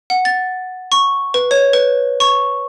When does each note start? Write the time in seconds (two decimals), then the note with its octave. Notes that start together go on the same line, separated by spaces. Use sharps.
0.10 F#5
0.25 A6
0.92 C#6
1.34 B4
1.51 C#5
1.73 B4
2.20 C#6